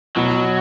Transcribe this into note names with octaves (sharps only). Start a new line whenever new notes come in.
B2 F#3